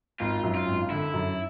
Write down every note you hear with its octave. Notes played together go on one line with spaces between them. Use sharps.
G#1 F4
F#2
F4
G#1
D3 E4
F#2